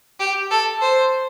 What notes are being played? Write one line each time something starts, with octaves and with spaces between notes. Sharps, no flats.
G4
A4
C5